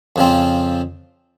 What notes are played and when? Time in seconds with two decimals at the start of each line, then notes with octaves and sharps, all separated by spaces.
0.16 F2 C#3 F3 C4